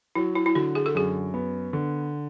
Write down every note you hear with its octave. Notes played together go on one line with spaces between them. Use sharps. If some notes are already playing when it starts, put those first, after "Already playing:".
F#3 E4
E4
E4
D3 F#4
G#4
A4
F#2 G#4
B3
D3